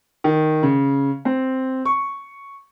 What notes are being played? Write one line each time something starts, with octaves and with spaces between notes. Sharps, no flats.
D#3
C#3
C4
C#6